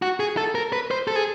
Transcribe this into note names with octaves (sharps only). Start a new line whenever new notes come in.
F#4
G#4
A4
A#4
B4
C5
A4
G#4